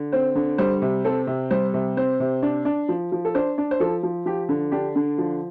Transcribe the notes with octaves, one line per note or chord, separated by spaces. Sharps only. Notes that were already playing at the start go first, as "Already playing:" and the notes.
Already playing: D3
C4 C5
D3
G3 C5
C3
C4 A4
C3
G3 C5
C3
C4 C5
C3
D4
D4
F3
F3
A4
D4 C5
D4
C5
F3 A4
F3
F3 G4
D3
D4 G4
D3
F3